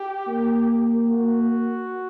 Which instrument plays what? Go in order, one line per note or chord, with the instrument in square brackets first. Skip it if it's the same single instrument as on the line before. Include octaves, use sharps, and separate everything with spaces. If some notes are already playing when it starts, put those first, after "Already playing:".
Already playing: [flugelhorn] G4
[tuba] A#3
[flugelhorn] F#4